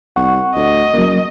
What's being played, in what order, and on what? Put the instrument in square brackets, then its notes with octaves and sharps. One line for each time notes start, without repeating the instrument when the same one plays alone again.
[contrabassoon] C2 [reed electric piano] F#5 C#6
[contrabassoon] D2 [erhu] D#5
[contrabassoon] F#1 [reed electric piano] F#3 A#3